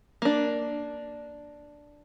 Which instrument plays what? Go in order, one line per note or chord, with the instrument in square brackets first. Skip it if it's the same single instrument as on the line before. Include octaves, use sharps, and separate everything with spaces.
[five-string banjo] A#3 D4